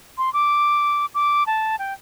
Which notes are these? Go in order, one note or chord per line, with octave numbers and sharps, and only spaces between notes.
C6
D6
D6
A5
G5